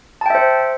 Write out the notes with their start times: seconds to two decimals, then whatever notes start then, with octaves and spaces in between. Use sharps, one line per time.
0.21 A5
0.26 G5
0.30 E5
0.35 C5